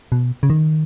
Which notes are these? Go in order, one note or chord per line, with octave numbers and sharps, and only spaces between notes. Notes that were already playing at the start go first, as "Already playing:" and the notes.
B2
C#3
D#3